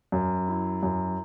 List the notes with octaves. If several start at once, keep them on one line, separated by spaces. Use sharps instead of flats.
F#2
E4
F#2